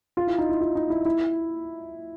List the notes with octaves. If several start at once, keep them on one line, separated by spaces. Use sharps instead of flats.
F4
E4
D#4
E4
F4
D#4
E4
E4